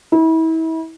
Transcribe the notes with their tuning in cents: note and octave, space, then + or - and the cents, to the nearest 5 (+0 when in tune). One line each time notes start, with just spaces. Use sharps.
E4 -35